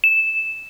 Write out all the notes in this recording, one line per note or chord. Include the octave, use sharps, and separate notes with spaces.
E7